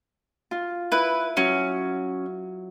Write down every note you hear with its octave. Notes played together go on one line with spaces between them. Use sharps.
F4
E4 B4
F#3 C#4